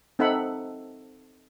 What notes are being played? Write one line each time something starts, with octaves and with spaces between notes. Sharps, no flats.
C4 D#4 A4 E5 F#5 B5